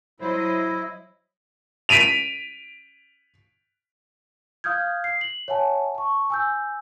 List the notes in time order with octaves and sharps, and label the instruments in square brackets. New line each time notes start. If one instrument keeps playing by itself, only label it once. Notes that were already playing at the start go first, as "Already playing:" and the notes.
[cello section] F#3 C5 D#5 [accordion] E4
[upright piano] B6 D7 D#7 F7
[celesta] F5 D#6 F6 G6 G#6
C7
F#7
C#5 E5 F#5 G#5 A5
A5 C#6
G#5 E6 G6